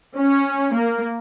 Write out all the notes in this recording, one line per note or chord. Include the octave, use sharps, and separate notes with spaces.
C#4
A#3